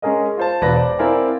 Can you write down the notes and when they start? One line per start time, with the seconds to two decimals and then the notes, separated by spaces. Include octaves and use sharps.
0.02 G#3 C#4 G#4 A#4 D#5
0.37 F4 C5 A5
0.62 E1 B4 D5 A5 A#6
0.75 C5 D5
0.99 C4 E4 A#4 D5 F5 G#5